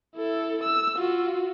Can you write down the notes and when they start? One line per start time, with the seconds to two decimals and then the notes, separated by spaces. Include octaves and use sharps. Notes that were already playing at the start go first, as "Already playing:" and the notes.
0.16 E4 A4
0.64 E6
0.96 F4 F#4